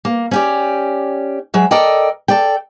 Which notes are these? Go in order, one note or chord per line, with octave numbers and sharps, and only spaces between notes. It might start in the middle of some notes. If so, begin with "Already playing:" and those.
A#3
C#4 G4 D5
F#3 G#3 E5
A4 A#4 D5 D#5 G5
A4 D5 G5